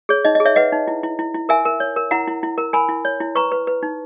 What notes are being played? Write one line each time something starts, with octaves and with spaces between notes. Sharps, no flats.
G#4 C#5
D#4 D#5
D#5
G#4
C#5 E5
B4 D#5 F#5
D#4
E4
E4
E4
E4
A#4 E5 G#5
A#4
C#5
A#4
E4 F#5 A#5
E4
E4
A#4
A#4 G#5 B5
E4
C#5
E4
B4 A#5 C#6
B4
B4
D#4